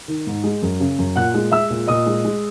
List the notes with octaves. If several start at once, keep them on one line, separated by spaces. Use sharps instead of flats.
D#3
G#2
G#3
F#2
C#3
F#2
A#2 F#5 F#6
G#3
G#3 E5 E6
A#2
A#2 D#5 D#6
G#3
G#3